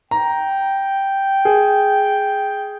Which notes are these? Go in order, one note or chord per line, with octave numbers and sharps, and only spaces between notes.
G5 A#5
G#4